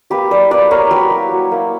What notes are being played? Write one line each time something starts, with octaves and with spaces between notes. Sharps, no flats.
A#3 G4 B4
E4 B4 D5
A#3 B4 D5
E4 A#4 C#5
F#3 G4 B4
A#3 E4
F#3
A#3 E4